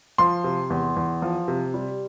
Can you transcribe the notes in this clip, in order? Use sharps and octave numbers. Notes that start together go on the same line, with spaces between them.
F3 C6
C3
E2
E2
F3
C3
G3